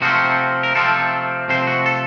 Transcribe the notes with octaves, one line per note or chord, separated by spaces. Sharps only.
C3 F3 A3 C4 F#4
A#4
C3 F3 A3 C4 A4
C3 F3 A3 C4 C5
F#4
A4